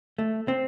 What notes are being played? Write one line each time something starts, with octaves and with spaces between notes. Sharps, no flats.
A3
C4